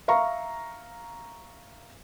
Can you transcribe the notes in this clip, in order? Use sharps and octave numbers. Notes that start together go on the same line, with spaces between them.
E5 F5 A#5 C#6